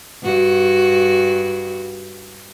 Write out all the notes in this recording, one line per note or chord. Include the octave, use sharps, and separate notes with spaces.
G2 F#4